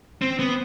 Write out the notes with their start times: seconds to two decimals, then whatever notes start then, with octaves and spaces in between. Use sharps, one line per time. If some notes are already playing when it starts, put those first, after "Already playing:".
0.22 C4
0.40 B3